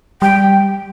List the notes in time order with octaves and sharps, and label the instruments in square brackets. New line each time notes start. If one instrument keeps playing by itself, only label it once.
[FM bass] G3 [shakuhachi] G5